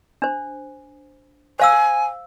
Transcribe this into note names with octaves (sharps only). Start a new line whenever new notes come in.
D4 C5
C5 F5 G#5 E6